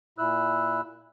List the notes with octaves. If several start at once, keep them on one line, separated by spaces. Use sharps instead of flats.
A#2 E4 E6 F#6